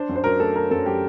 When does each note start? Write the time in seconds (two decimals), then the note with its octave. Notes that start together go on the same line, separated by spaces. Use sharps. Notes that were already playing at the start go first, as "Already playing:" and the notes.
Already playing: D4 C5
0.09 F#2
0.16 C5
0.24 F#3 A#4
0.39 A3 A4
0.55 D4 A#4
0.71 F#2 A4
0.86 F#3 G4